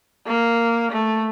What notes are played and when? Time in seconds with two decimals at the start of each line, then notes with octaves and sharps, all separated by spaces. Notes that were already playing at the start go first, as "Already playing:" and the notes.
0.26 A#3
0.92 A3